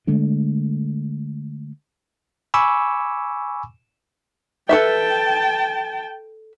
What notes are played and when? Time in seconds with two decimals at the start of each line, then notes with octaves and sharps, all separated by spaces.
0.07 D3 G#3 A3 D4
2.54 G#5 B5 C#6 D6 E6
4.69 A4 B4 E5 G5 A5